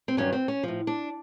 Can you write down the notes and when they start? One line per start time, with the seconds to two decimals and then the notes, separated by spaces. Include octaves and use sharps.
0.08 C4
0.17 G2 D#3 F#3 C#4
0.33 C4
0.48 C#4
0.63 A2 F3
0.87 D4